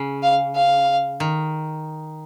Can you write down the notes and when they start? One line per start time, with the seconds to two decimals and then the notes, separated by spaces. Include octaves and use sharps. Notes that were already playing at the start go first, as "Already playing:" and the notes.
Already playing: C#3
0.23 F5
0.56 F5
1.20 D#3